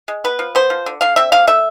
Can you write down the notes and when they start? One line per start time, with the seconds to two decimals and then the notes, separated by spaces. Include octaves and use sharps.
0.08 G#3
0.24 B3 B4
0.39 F3
0.55 B3 C5
0.70 F3
0.86 D3
1.01 D3 F5
1.16 C4 E5
1.32 D3 F5
1.47 A3 E5